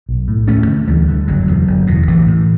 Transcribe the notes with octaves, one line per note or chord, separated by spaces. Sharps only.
B1
A2
D2 A3 C#4
D3
D2 E3 G3
D3
F#1 D3 F#3
E2 B2
F#1
E2 B2
A1 E3
A2